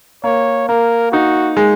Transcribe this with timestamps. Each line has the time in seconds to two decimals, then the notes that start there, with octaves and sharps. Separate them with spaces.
0.24 A#3 C#5
0.68 A#3 A#4
1.12 D#4 F#4
1.57 G#3